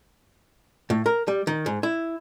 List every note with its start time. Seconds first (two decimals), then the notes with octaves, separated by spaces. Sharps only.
0.90 A2
1.06 A#4
1.28 G3
1.47 D#3
1.66 G#2
1.83 E4